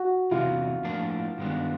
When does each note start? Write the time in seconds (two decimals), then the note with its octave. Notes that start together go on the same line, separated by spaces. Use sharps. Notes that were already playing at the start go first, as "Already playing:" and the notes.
Already playing: F#4
0.31 E2 C3 E3 F4
0.84 A2 F3 A#3 D4
1.38 G2 D#3 G#3 B3 D4